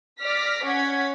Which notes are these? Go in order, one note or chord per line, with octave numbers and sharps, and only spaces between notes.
D5 F6 A#6 B6
C#4 F#5 G#6 B6